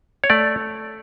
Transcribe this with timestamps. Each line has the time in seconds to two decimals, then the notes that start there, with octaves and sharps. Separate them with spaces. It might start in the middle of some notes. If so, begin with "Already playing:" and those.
0.24 C#5
0.30 A3 D5